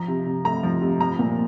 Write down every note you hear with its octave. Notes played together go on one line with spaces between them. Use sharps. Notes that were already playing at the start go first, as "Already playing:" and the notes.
Already playing: F3 A#5
C3
C3
A3 A#5
F3
C3
F3 A#5
A#2